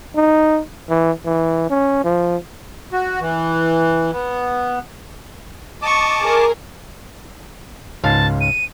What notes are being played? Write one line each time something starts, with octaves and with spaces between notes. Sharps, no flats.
D#4
E3
E3
C#4
F3
F#4
E3
B3
D#5 A5 C#6 D6
G#4 A#4
C#2 G#2 F5 A5
D#7